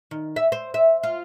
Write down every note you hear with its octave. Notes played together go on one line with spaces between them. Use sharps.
D#3
E5
C5
E5
F4